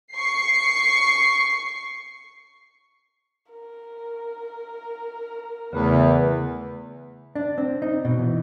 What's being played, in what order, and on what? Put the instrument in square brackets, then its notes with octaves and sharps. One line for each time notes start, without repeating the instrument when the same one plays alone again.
[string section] C#6 C7
[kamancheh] A#4
[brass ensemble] E2 [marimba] C#3 A3 [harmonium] B3 B4
[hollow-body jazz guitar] D4
C4
D#4
B2
E3